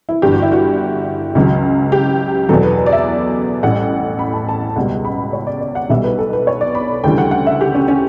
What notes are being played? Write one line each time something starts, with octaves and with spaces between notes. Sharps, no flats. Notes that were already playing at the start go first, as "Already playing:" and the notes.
E4
G1 G2 E3 G3 G4
F#4
E4
F#4
C#2 C#3 F#3
G4
E2 B2 F#3 A4
B4
B4
D5
E5
A1 A2 G3 F#5
B5
A5
A5
C#2 B2 G3 F#5
B5
C#5
D5
D5
F#5
B1 B2 G3 E5
B4
A4
B4
C#5
D5
B5
D2 C#3 E3 G3 G5
F#5
F#5
E5
G4
C#4
C#4